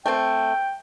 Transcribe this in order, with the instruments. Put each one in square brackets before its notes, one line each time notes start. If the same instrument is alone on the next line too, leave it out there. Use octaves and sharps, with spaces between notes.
[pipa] A3 C4 [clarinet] G5